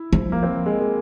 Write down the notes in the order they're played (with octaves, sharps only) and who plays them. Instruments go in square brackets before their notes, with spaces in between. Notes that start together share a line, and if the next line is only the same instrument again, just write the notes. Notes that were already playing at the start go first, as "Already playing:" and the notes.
Already playing: [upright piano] E4
[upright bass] F3
[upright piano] A#3
C4
G#3
G#3